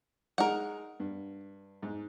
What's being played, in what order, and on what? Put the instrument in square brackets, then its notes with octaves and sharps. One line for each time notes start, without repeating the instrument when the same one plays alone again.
[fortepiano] G#3 D#4 [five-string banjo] A#4 F#5
[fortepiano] G2
G#2